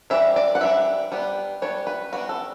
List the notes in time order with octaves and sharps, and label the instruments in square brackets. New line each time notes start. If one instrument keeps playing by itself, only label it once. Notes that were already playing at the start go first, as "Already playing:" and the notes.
[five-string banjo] E3 G3 D4 E5
D5
F#5
E3 G3 D4 E5
G3 B3 D4
G3 B3 D4 C#5
B4
G3 B3 D4 F#4
A4